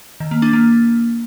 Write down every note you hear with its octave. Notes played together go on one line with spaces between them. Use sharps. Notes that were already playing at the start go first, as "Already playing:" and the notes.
D#3
A#3
D4
A#3